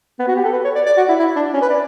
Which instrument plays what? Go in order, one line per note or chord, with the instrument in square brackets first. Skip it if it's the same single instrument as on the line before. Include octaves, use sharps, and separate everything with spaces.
[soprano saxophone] B3
F#4
G4
A4
B4
C#5
D5
D5
F#4
E4
E4
D4
C#4
B4
D5